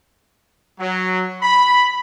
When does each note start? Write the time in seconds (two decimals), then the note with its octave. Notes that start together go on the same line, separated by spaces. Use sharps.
0.79 F#3
1.42 B5